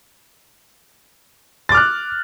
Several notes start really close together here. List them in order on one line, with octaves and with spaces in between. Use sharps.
A6 D6 F6 F#6